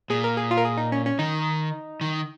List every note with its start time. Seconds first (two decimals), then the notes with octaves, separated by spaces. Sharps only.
0.10 A#2 G#4
0.24 A#4
0.37 G#4
0.51 F4
0.57 A#4
0.65 G#4
0.77 D#4
0.92 C#4
1.06 C#4
1.19 D#3 D#4
2.01 D#3